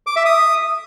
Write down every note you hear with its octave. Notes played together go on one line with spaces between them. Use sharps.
D6
E5
D#6